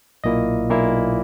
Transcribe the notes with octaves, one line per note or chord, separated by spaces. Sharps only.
B1 A#2 A#3 E4 D#5
B1 A#2 A#3 E4